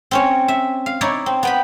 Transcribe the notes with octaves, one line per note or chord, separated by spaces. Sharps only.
C4 C#4 C#5
E5
F5
D#4 E4 C#5 D5
C4
B3 G5 B5